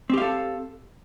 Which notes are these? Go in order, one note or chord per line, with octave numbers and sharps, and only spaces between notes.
C4 G4 A4 F5